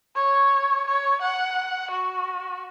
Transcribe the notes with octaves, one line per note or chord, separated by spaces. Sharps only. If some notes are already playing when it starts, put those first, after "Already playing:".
C#5
C#5
F#5
F#4